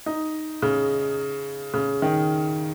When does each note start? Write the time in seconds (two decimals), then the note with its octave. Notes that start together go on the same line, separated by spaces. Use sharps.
0.06 D#4
0.62 C#3
1.74 C#3
2.02 D#3